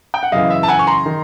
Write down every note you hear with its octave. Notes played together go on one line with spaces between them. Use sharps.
G5
F#5
F#2 C#3 E3 D#5 F5
E5
A5
F#5 G#5
C#6
A#5 C6
D#3